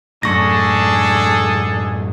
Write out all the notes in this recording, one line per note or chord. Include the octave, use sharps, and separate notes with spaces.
F#2 A2 D4 G#4 A4 C#6 A#6